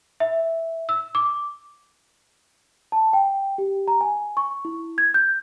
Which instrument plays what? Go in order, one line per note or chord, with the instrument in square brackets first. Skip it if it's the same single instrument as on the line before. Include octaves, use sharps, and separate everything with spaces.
[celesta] E5
E6
D6
A5
G5
G4
A#5
G#5
C#6
E4
G#6
G6